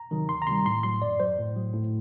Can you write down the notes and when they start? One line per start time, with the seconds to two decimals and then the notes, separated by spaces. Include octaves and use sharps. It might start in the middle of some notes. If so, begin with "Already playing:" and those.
Already playing: A#5
0.11 C3 D#3 F#3
0.29 D2 C6
0.42 A#5
0.47 C3 D#3 G3 C6
0.65 A2 C6
0.83 F#3 C6
1.01 F#2 D5
1.20 F#3 C5
1.38 A2
1.56 F#3
1.74 A2